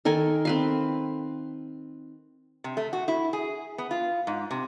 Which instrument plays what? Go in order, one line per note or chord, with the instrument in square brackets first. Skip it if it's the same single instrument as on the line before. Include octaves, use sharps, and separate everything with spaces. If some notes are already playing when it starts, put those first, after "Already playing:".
[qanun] D#3 A4 A#4 G#5
C4 B4 F5
[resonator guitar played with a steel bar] C3
A3
F#4
E4
G#4
B3
F4
G#2
C3